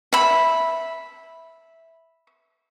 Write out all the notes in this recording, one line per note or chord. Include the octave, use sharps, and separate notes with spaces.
E5 B5